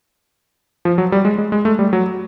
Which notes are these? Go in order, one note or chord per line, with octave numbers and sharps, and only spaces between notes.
F3
F#3
G3
G#3
G#3
G#3
A3
G3
F#3